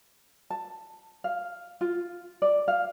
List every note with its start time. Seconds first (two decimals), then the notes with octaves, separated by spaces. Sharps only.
0.50 A5
1.24 F5
1.81 F4
2.42 D5
2.68 F5